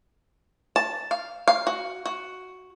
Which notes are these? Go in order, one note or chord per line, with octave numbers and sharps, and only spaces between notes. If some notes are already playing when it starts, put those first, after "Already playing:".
A5
F5
F5
F#4
F#4